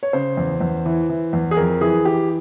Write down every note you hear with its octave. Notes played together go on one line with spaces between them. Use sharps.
C#5
C#3 C5
E2
E2
E3
E3
E2
G#4
F2 A#4
E3 G#4
E3 G4